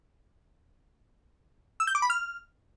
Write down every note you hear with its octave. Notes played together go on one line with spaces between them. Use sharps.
E6
G6
D6
B5
F6